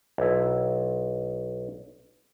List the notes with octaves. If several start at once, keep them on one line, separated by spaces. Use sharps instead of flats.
B1 E4